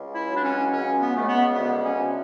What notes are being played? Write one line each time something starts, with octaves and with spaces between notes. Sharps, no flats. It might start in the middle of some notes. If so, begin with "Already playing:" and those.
Already playing: C#2
E4
F#3
D4
C#4
C#2 C#4
B3
C#2 A3
B3
D2 B3
C#4
D2